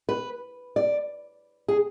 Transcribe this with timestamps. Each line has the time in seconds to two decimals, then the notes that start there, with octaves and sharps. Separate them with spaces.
0.09 B4
0.76 D5
1.68 G#4